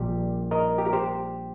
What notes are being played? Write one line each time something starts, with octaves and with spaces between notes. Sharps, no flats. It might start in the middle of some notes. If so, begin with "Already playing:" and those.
Already playing: A#1 A#2 G3 G4
A#4 D#5
G4
A#4
G4 C5